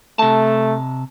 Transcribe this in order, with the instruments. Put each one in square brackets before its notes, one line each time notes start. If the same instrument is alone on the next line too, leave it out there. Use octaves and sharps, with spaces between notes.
[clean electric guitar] C3 A5 [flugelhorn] A3